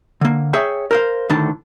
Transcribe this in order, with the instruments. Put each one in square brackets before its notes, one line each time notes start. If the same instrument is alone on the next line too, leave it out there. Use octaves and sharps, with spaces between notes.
[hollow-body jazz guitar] D3 A#3
G#4 C#5 E5 G5
A#4 C5 F5
D2 A2 D3 D#3 D4 A5